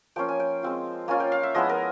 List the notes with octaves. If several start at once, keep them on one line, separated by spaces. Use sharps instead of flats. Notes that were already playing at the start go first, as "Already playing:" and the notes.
F3 A#3 C#4 F4 G5
G#5
G5
G#3 C4 F4
A#3 C#4 F4 G#5
G5
F5
E5
F3 G#3 B3 E4 D#5
A#4